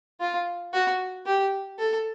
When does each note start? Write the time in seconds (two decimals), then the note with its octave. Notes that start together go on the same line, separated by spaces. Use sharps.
0.20 F4
0.73 F#4
1.26 G4
1.79 A4